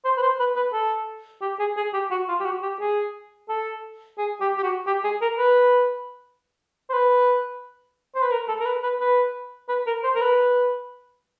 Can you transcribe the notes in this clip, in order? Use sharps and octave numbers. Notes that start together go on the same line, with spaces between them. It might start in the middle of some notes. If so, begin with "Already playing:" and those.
C5
B4
C5
B4
B4
A4
G4
G#4
G#4
G4
F#4
F4
G4
F#4
G4
G#4
A4
G#4
G4
G4
F#4
G4
G#4
A#4
B4
C5
B4
C5
B4
A#4
A4
A#4
B4
B4
B4
B4
A#4
C5
A#4
B4